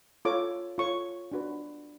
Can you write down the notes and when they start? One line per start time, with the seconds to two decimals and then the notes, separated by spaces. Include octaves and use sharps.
0.25 F4 A4 C#5 D6
0.78 F4 A4 C#5 C#6
1.32 D4 F#4 B4